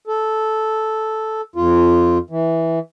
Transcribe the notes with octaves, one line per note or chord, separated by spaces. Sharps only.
A4
F2 F4
E3